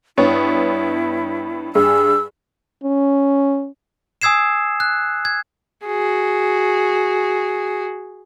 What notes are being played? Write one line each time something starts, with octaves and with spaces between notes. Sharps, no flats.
G2 B3 E4 C#5
G2 G#4 E6
C#4
G#5 D#6 E6 G#6 C7 E7
F#6
G#6
F#4 G#4